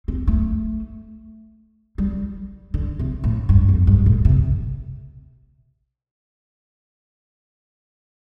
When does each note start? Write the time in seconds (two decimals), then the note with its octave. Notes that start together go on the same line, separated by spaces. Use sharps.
0.08 C4
0.27 A3
1.98 G3
2.74 D3
2.99 C3
3.24 A2
3.49 G2
3.68 F2
3.87 G2
4.06 A2
4.25 C3